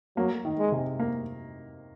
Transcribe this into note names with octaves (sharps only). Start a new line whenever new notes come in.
F#3 A#3
D#3
G#3
C3
A#3